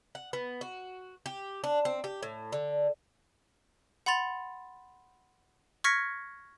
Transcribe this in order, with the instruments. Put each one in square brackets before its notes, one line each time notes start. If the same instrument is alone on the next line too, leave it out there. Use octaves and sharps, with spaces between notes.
[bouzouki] F#5
B3
F#4
G4
D4
C4
G4
A2
D3
[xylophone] F#5 B5 C6 A6 F7
C#6 F6 G#6 A#6 B6 C#7